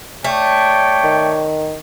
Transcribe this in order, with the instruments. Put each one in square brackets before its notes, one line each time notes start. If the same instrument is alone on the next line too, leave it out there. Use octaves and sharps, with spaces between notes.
[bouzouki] A3 [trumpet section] C#5 D5 G5
[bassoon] D#3